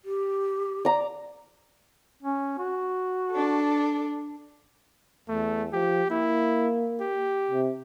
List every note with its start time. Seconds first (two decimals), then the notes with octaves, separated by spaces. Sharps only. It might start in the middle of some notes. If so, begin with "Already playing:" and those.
0.05 G4
0.85 D5 A#5
2.23 C#4
2.58 F#4
3.30 D4 A4
5.29 E2 A3
5.73 F3 G4
6.10 A#3 E4
7.00 G4
7.51 C3